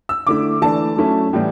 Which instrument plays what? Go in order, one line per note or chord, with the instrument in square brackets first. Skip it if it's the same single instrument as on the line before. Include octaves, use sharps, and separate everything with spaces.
[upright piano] E6
D3 A3 E4 D6
E3 A3 D4 A5
F#3 A3 C#4 E4
A2 E3 G3